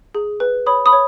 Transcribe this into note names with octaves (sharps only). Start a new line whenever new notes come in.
G#4
B4
C#5 B5 D#6
B5 D#6
C#5